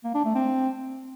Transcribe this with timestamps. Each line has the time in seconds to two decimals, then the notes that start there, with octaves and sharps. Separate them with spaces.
0.04 A#3
0.14 D4
0.25 A3
0.35 C4